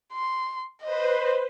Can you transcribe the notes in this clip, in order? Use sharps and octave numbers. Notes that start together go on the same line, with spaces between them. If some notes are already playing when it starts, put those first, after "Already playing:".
C6
B4 C5 D#5